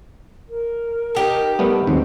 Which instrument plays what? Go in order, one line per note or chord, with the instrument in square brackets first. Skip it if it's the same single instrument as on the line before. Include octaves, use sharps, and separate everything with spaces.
[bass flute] A#4
[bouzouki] D#4 G4 A4
[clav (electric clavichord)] G3 A3 B3
[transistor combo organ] D#2 C4 [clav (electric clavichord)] G#2 [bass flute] F#3